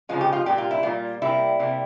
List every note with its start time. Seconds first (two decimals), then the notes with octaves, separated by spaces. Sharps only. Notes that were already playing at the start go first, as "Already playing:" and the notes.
0.09 C#3 F3 G#3 F4
0.21 G4
0.33 F4
0.46 A#2 G3 A#3 G4
0.58 F4
0.71 E4
0.83 A#2 G3 A#3 F4
1.22 C3 G3 A#3 E4
1.59 C3 G3 A#3